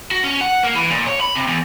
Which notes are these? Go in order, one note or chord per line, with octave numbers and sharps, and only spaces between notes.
F#4
C#4
F#5
A#3
E3
A#2
C#5
B5
C3
E2